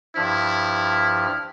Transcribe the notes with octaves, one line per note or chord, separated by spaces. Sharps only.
G2 F3 E4 F6